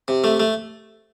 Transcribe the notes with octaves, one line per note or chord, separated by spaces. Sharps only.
C3
A3
A3